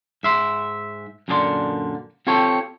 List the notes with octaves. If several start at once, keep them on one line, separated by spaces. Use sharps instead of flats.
G#2 E5 C6
F#2 A#2 D3 G#4 D5 C6
C4 F4 G4 A4 C#5